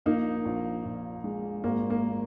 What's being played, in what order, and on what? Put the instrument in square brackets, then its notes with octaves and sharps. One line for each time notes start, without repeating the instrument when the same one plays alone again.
[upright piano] A#1 A#3 D#4
A#1
A#2
G#3
G#1 A#3
A#3